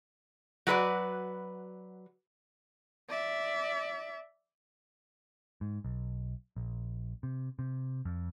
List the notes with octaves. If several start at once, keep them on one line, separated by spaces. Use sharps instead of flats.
F#3 F#4 B4 C5 D5
D5 E5
G#2
B1
A#1
C3
C3
F2